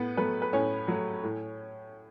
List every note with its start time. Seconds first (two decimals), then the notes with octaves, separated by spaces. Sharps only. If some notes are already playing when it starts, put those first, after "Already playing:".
Already playing: A2 B3 B4
0.17 F#3 A3 B3 B4
0.42 B4
0.53 A2 C#4 C#5
0.88 F#3 A3
1.23 A2